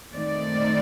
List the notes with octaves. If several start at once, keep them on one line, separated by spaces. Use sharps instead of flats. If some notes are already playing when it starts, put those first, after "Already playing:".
D#3 A3 C4 D#4 D5